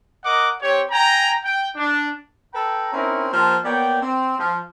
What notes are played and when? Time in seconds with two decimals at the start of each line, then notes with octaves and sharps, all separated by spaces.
0.25 A#4 D#5 F#5 D6
0.62 C4 G4 C#5
0.91 G5 G#5 A#5
1.45 G5
1.76 D4
2.54 A4 B4 G5 A#5
2.92 C4 C#4 D#4 E4 A#4 C#5
3.33 F3 A#3 G4 C5 A5 A#5
3.64 A#3 B3 C#5 D5 G5
4.02 C4
4.39 F3